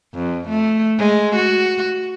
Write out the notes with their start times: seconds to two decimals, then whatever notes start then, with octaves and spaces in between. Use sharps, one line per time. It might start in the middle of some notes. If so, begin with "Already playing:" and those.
0.15 F2
0.49 A3
0.99 G#3
1.36 F#4